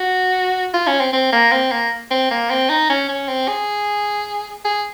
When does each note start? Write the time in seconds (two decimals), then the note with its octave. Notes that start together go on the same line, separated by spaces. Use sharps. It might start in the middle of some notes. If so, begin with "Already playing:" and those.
Already playing: F#4
0.74 F4
0.87 C#4
1.00 C4
1.13 C4
1.33 A#3
1.52 C4
1.72 A#3
2.11 C4
2.31 A#3
2.50 C4
2.70 D#4
2.90 C#4
3.09 C#4
3.28 C4
3.48 G#4
4.65 G#4